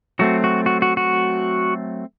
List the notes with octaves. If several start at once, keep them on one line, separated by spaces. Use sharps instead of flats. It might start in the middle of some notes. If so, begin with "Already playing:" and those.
F#3 A3 C4 F#4
F#4
F#4
F#4
F#4